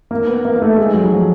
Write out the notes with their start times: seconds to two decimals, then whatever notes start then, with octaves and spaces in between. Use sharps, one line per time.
0.11 A#3
0.27 B3
0.45 A#3
0.56 A#3
0.62 A3
0.77 G#3
0.94 F#3
1.12 F3